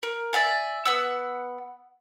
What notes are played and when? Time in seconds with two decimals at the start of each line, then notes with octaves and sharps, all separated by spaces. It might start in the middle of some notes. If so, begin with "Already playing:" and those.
0.03 A#4
0.33 D5 E5 F5 G#5
0.85 B3 F#5 E6